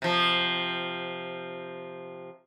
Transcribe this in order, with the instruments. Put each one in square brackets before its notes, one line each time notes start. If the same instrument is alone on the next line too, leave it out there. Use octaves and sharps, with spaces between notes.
[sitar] C3 F3